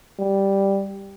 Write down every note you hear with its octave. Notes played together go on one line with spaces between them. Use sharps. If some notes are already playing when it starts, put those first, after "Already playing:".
G3